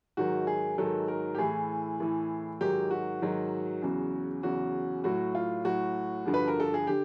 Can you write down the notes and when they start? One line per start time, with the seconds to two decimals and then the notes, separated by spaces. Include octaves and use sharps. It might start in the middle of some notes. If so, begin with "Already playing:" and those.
0.17 G#2 D#3 F#3 F#4
0.47 G#4
0.78 G#2 D#3 F#3 A4
1.08 A#4
1.35 G4
1.38 A2 E3 G#4
2.00 A2 E3
2.61 G#2 D#3 F#3 G4
2.91 F#4
3.22 G#2 D#3 F#3
3.82 E2 C#3 F#3
4.43 E2 C#3 F#3 F#4
5.04 A2 F#3 F#4
5.35 F4
5.65 A2 F#3 F#4
6.25 G2 D3 F3
6.34 B4
6.48 A#4
6.60 A4
6.74 G#4
6.87 D3 G4